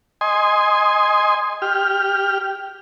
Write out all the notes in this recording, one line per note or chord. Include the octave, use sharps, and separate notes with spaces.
D#5 G#5 C6
G4 F6